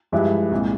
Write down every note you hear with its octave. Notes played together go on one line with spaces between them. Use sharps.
G2 F3 G#3 E4 G4
C2 A#2 G#3